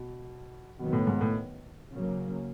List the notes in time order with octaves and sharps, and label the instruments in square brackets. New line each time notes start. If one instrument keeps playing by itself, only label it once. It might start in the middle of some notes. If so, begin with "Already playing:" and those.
Already playing: [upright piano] B2
[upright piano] B2 [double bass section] D#3 F#3 B3
[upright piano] A2
G#2
A2
[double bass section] C#3 F#3 A#3